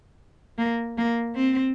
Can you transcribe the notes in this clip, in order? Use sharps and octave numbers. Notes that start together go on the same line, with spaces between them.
A#3
A#3
C4